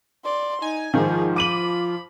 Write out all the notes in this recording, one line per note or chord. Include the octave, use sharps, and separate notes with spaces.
D5 C6
D#4 G#5
G#2 D#3 F3 D#4 G#4
B5 D6 D#7 F#7